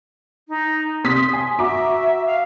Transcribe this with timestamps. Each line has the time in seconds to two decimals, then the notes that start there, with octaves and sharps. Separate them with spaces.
0.48 D#4
1.04 C3 C6 D#6 B6
1.33 G#5
1.59 F#4 E5 A#5 D6
2.26 F5